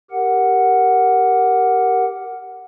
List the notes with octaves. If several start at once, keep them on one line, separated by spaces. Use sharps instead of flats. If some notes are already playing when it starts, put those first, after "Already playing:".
G4 A#4 F#5